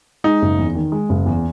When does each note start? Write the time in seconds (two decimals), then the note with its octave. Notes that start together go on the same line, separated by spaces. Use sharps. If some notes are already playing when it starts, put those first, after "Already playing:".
0.24 G#3 D#4
0.42 F#1
0.59 E2
0.75 D#3
0.92 G#3
1.09 F#1
1.26 E2